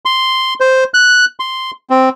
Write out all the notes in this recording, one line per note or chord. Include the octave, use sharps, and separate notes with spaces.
C6
C5
F#6
C6
C4